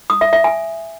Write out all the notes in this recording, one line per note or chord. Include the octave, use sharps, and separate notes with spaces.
D#6
E5
E5
G#5